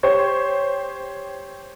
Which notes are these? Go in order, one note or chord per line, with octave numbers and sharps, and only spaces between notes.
G4 C5 C#5